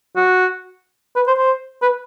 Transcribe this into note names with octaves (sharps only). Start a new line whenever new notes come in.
F#4
B4
C5
C5
B4